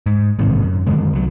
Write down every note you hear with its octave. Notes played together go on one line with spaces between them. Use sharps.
G#2
A1 G#2 C3 D#3
F#2
F#2 D3 D#3 G#3
C2 F#3